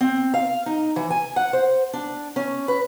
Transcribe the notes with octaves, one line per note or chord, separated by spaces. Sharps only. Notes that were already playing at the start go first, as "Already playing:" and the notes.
C4
F5
D#4
E3
G#5
F#5
C5
D4
C#4
B4